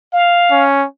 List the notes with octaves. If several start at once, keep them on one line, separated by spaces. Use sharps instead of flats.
F5
C#4